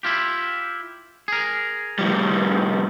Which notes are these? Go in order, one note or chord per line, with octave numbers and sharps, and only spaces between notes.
E4 F4 G4
G#4 A#4
A2 F3 G3